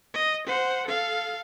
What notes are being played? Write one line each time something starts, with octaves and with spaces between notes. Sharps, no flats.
D#5
C5 F#5
A4 F5